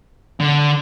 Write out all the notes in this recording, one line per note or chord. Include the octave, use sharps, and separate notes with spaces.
D3